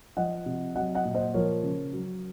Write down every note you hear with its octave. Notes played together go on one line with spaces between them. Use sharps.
F3 D#5 F#5
C3
F#3 D#5 F#5
D#5 F#5
A#2
C5 D#5
F3 A#4 C#5
C#3
F#3